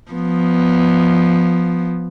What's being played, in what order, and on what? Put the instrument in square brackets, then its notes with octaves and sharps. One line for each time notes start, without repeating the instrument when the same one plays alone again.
[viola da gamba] F3 B3